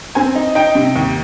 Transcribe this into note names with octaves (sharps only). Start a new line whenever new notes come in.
C4 G#5
D#4
D#4 G5
C3
D#2